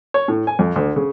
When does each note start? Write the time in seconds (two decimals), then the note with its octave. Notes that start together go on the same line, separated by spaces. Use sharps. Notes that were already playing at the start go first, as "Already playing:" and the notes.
0.14 C#5
0.28 A2
0.47 G#5
0.59 F2
0.76 D2
0.96 C#3